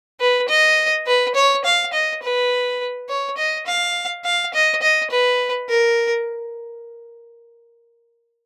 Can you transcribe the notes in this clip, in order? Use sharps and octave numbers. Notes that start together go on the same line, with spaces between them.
B4
D#5
B4
C#5
F5
D#5
B4
C#5
D#5
F5
F5
D#5
D#5
B4
A#4